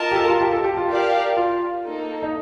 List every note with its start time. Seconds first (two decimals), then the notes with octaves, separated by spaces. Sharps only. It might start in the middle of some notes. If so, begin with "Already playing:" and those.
Already playing: F4 A#4 D#5 A5
0.11 G4
0.15 A4
0.28 F4
0.41 G4
0.52 A4
0.64 G4
0.77 F4
0.88 G4 A#4 D5 F5 A5
1.37 F4
1.85 A#3 D#4 A4
2.22 D#4